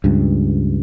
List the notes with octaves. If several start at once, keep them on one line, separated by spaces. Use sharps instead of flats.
C#2 G2